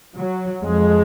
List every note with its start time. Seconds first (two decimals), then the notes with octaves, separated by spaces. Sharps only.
0.15 F#3
0.62 F2 G#3